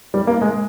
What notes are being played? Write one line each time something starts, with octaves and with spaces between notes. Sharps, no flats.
G3
A#3
G#3